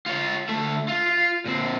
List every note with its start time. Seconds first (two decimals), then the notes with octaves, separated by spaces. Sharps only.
0.06 F4 C#5
0.49 D2 A3
0.88 F4
1.46 A#2 C4